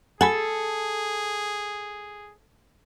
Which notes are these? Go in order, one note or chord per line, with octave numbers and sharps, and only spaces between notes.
G#4 A4 F#5 G#5 B5